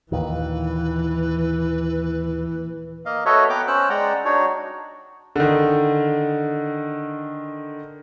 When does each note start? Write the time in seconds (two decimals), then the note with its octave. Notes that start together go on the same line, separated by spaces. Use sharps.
0.12 D#2 A#2 D#3 E3 B4
3.06 A#3 D#5 F5
3.25 F#4 A4 B4 C#5 D#5 E5
3.50 B3 B4 G5 A#5 D6
3.68 C#4 C5 E6 F#6
3.90 G#3 D5 F#5 G5 A#5
4.25 D4 D#4 F#4 C#5
5.36 D3 D#3